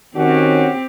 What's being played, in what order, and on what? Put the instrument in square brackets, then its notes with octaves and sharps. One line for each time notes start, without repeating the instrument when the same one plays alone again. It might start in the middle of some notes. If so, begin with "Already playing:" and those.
[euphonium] D#3 [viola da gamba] C4 G4 [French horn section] C#4 F#4